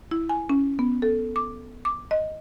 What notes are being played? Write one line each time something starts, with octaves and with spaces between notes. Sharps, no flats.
E4
G#5
C#4
B3
A4
D6
D6
D#5